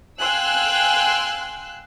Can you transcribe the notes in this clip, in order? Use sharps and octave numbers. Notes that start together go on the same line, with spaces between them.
F5 G5 G#5 C6 E6 F#6